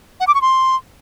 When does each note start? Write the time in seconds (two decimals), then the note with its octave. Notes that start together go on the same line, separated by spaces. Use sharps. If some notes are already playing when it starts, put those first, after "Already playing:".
0.20 F#5
0.27 D6
0.35 C#6
0.42 C6